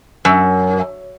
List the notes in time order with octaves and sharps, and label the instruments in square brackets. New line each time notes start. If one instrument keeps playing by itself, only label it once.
[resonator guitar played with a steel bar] F#2